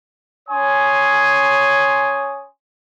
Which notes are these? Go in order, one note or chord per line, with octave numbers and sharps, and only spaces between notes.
C#4 C#5 G#5 C6 D#6